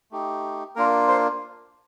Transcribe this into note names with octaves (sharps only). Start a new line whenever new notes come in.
A3 D#4 G4
A#3 D4 F4 A#4
C5